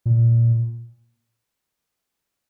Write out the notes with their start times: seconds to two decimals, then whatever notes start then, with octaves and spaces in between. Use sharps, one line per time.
0.06 A#2